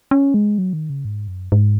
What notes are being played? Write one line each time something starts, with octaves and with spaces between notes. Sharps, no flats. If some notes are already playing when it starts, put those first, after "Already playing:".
C#4
G#3
F#3
D#3
C#3
G#2
F#2
G#2